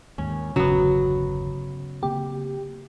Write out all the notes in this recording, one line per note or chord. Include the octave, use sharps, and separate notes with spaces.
D#2 G#2 C#4
G1 E2 C#3 F#3 B3
C#3 A#3 C4 G4